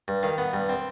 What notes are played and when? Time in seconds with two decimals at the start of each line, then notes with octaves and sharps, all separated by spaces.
0.08 G2
0.23 D#3 F5
0.38 B3
0.53 G2
0.69 C4